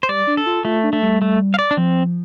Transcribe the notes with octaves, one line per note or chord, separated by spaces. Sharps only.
C5
G3 D5
D4
A4
F4
A3 F4
D4
A3
G3
A3
F5
D5
D4
F3 C4